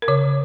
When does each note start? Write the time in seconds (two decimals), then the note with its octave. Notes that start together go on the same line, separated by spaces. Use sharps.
0.02 A#4
0.08 C#3 C#5